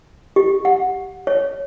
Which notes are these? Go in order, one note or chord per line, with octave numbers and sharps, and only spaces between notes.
G4
F#5
C#5